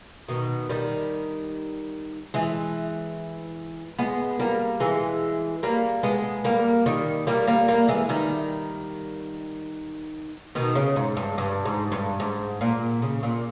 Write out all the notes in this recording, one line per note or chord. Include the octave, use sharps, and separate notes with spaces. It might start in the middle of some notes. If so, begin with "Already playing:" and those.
B2 D#3
D#3 G3
E3 G#3
G#3 B3
G3 A#3
E3 G#3
G3 A#3
G#3 B3
G3 A#3
D#3 G3
G3 A#3
G3 A#3
G3 A#3
E3 G#3
D#3 G3
B2 D#3
C#3
G#2
G2
G2
G#2
G2
G#2
A#2
C#3
A#2